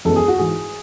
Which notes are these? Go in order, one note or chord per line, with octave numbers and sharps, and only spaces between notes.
F#2 E3 G#3 B3 A4
G#4
F#4
G#2 E3 G#3 G#4